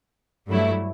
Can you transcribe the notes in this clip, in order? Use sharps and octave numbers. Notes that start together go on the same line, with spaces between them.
G2 F#3 A3 E4